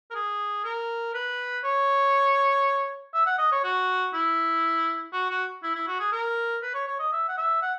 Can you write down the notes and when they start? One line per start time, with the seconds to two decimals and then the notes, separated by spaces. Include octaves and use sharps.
0.11 A#4
0.15 G#4
0.64 A#4
1.14 B4
1.64 C#5
3.14 E5
3.26 F#5
3.38 D#5
3.52 C#5
3.63 F#4
4.14 E4
5.13 F#4
5.30 F#4
5.63 E4
5.75 E4
5.87 F#4
6.00 G#4
6.12 A#4
6.62 B4
6.74 C#5
6.88 C#5
6.99 D#5
7.12 E5
7.28 F#5
7.37 E5
7.62 F#5